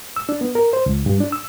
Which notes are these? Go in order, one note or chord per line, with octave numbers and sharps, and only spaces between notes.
E6
D4
B3
A#4
C5
C#2
G2
D4
E6